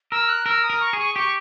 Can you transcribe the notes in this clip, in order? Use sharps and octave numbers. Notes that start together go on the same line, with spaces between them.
A#4 E6
F#6
A#4 E6
D#6
A#4
C#6
G#4
C#6
G4 C#6